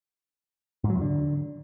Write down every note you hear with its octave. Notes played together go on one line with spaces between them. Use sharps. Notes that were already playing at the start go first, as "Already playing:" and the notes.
G#2
F#3
E2
D3